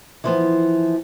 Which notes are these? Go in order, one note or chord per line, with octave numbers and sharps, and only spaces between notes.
E3 F3 B3